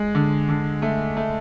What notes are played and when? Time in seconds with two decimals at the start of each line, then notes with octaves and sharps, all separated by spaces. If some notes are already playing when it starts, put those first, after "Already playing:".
Already playing: G#3
0.15 D3
0.49 D3
0.82 A3
1.17 A3